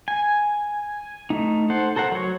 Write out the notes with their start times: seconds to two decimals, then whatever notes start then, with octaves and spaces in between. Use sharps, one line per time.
0.08 G#5
1.30 A3 D#4
1.70 A4 C5 F#5
1.96 A4 A#4 C5 F#5
2.12 F#3 C#5